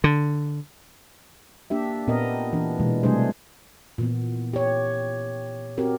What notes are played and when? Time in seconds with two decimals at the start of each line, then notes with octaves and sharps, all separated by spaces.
0.04 D3
1.70 A#3 D4 G4 E5
2.07 A#2 B3 C4 A#4 D#5
2.53 E3 D4
2.80 B2 E3 G#3
3.03 C3 G3 A3 D4 G#4 C5
3.98 A#2 E3 B3
4.53 G4 C#5
5.78 C4 F#4 G4 A#4